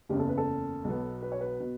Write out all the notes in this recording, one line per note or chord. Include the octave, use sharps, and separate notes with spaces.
F#1 E2 C#3 G4
A4
B4
A4
B1 B2 F#3 B3
B4
C#5
B4
B2